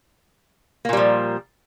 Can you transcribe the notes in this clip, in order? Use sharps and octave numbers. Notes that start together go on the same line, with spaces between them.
A#2 F3 G3 A#3